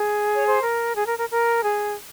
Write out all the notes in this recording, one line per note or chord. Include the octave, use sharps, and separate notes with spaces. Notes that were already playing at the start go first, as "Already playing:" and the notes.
Already playing: G#4
C#5
C5
A#4
G#4
A#4
A#4
A#4
G#4